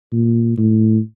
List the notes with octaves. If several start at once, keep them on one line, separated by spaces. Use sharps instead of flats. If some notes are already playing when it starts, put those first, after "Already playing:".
A#2
A2